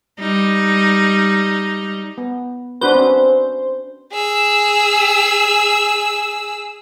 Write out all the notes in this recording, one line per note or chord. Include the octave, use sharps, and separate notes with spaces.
G3 D#4
B3
D4 F#4 B4 C5
C4 C#4
G#4 E6